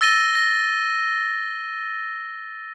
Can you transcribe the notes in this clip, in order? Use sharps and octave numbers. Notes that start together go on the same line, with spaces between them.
E6 A6 A#6 D#7 G7
A#6